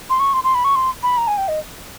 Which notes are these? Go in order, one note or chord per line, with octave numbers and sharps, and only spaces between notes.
C6
C#6
C6
C6
B5
C#6
C6
B5
A#5
G#5
G5
D#5